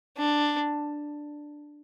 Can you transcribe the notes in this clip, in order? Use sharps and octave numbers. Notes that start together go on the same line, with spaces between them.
D4